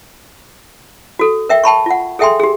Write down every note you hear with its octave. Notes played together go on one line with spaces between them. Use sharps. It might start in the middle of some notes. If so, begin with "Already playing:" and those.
F#4 A4
A#4 E5 G5
G5 A5 B5 C#6
F4 F#5
G#4 A4 E5 G5 G#5 C6
G4 G#4